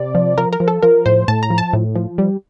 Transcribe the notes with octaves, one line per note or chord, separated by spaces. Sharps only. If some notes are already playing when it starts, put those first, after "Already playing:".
Already playing: C3 D5
F3
F3 A#4
A#4
F3
A4
F3 A#4
A2 C5
A2 A5
A#5
F3
A5
A2
F3
G3